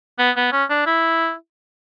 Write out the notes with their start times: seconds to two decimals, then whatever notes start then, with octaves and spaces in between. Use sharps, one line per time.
0.19 B3
0.36 B3
0.52 C#4
0.70 D4
0.87 E4